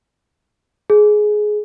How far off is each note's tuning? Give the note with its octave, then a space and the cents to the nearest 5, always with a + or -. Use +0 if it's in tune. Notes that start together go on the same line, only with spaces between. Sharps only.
G#4 +15